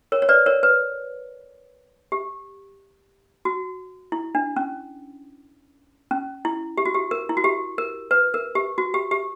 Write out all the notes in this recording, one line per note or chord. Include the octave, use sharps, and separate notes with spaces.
A#4 C#5
C#5
B4 D5
A#4 C#5
B4
G4
F#4
E4
D4
C#4
C#4
E4
G4
F#4
G4
A#4
E4
F#4
G4
A#4
B4
A#4
G4
F#4
G4
G4